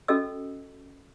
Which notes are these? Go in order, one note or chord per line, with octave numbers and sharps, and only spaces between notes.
C#4 F#4 A4 D#5 E6